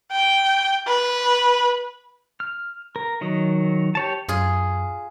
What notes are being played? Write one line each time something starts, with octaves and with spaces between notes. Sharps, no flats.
G5
B4
F6
A#4
D#3 F#3 D#5
G4 C#5 A5
F#2 F4 G#4